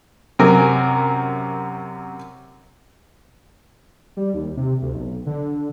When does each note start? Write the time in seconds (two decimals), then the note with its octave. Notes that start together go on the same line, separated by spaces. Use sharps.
0.39 F#2 C3 A#4 G#5
4.17 G3
4.34 D#2
4.57 C3
4.82 D2
4.93 B1
5.26 D3